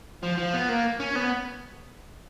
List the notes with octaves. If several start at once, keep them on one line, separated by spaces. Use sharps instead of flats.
F3
F3
B3
A#3
C#4
B3